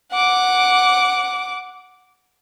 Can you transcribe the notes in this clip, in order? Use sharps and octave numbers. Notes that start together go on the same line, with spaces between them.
F#5 D6